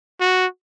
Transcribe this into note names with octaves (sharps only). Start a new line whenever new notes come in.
F#4